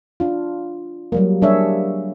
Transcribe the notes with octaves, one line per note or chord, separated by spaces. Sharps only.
D4 F4
F#3 G3 A#3
G3 A#3 D4 G#4 C#5 E5